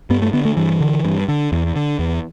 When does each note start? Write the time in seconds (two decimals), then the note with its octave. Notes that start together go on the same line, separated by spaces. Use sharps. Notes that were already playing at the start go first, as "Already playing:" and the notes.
0.10 G2 B3
0.22 A3
0.33 D3 B3
0.45 A3
0.57 G2 E3
0.81 D3
1.05 G2
1.28 D3
1.52 E2
1.76 D3
1.99 E2